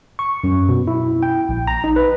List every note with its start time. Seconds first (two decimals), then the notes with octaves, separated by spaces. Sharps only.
0.19 C#6
0.44 F#2
0.69 B2
0.87 E4
1.23 G5
1.49 A#1
1.67 A#5
1.84 D#4
1.96 B4